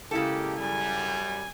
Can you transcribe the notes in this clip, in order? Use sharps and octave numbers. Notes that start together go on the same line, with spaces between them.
C#3 G#3 A#3 E4 G4 A4
F#2 G3 G#5